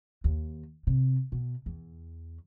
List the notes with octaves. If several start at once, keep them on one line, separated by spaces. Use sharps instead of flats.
D#2
C3
B2
E2